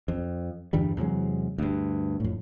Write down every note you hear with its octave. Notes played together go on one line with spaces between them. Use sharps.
F2
E2 G2 D3 G3
E2 C3 F#3 G#3
D2 G2
F2 A2